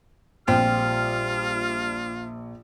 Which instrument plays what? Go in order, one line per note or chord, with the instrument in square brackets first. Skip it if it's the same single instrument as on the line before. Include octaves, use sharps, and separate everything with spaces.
[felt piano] A#1 [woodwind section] G3 F6 [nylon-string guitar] C4 [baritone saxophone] F4